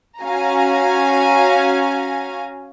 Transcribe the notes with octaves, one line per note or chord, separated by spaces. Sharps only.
C#4 F#4 F5 G#5 A#5